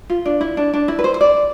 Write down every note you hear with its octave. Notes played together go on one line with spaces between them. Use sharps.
F4
D4
E4
D4
D4
E4
B4
C5
C5
D5